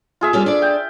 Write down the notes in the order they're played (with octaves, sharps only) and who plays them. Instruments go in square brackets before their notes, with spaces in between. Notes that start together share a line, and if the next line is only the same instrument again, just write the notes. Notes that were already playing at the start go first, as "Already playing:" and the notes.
[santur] F4 G#4 E5
[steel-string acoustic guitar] G3 C#4 A4
D4 D5
[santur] G5